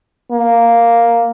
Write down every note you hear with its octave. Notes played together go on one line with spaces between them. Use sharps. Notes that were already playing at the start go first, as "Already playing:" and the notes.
A#3